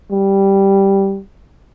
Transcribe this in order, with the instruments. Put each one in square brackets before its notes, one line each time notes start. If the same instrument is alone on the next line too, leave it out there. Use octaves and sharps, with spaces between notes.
[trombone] G3